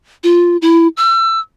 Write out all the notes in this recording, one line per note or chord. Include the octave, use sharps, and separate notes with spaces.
F4
E4
E6